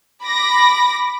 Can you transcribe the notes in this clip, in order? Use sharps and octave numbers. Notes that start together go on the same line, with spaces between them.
B5 D6 A#6